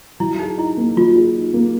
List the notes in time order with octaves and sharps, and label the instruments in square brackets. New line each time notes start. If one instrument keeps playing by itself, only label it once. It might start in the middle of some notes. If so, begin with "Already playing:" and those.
[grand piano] F#3 [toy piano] E4
[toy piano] D#4 [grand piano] G#4
[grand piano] D#4 [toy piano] E4
[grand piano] A#3
[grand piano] F#3 [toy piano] F4
[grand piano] G#4
D#4
A#3